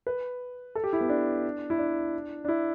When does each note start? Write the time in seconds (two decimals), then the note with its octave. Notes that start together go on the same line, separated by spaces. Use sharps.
0.07 B4
0.75 A4
0.84 G4
0.93 E4
1.01 B3
1.09 D4
1.70 E4
1.78 D4
2.45 D4
2.48 E4